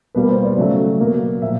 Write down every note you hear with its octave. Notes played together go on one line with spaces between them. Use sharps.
B2 G3 A#3 B4
C5
D5
C#3 F#3 A3
B2 F#3 A#3
A#2 F3 E5